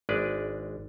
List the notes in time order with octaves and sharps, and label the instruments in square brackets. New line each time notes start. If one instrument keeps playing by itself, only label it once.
[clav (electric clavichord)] G#1 G#3 D4 B4 D5